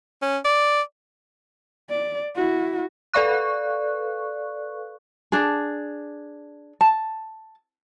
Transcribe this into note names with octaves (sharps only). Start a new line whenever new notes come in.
C#4
D5
D5
E4 F#4
A4 B4 D5 F5 C#6 F#6
D4 G#4
A5